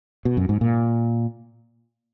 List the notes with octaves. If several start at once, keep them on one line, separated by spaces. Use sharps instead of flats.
B2
F#2
G#2
A#2